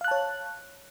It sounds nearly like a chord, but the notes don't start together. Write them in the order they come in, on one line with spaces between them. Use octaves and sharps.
F5 F#6 A5 C#5